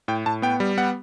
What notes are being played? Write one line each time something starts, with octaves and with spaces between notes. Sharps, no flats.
A2 G5
A2 A5
B3 G5
G3
B3 F#5